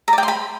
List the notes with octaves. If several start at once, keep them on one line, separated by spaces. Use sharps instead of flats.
A#5
D5
G5
C6
B5